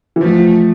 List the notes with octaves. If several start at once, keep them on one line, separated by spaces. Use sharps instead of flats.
E3
F3 A3